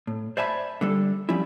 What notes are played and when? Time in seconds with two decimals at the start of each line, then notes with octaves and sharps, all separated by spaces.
0.07 A2
0.37 C5 D5 E5 G#5 A5 B5
0.81 D3 G3 A4
1.29 F3 G3 C#4 E4